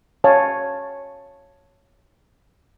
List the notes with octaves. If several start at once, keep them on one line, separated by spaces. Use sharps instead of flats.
C#5 F5 G#5 A5